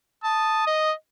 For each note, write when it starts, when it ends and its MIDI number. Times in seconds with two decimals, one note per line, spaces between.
0.24 0.64 81
0.24 0.93 87
0.67 0.93 75